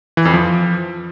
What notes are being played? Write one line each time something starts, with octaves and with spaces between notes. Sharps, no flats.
E3
F2
F3